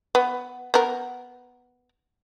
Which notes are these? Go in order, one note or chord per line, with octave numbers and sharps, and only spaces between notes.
B3
B3 A#4